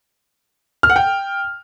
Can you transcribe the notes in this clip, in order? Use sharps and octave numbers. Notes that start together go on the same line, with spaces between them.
F6
F#5
G5